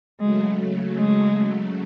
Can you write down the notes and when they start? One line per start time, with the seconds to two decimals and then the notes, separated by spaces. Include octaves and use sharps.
0.21 C#3 F#3 G#3 A3
0.97 G#3